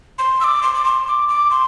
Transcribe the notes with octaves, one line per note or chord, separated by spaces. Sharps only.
C6
E6
D6
C6
D6
C6
D6
D6
C6